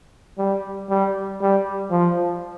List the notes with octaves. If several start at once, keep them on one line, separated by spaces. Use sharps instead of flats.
G3
G3
G3
F3